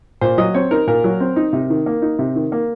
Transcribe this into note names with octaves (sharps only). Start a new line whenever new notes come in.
A#2 C5
F#3 D#5
C4 C#5
D#4 A#4
A#2 A#4
F#3
C4
D#4
C3
D#3
A#3
D#4
C3
D#3
A#3